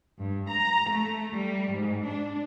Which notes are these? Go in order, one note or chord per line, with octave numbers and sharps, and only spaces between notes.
G2
A#5
A3
G3
G#2
D4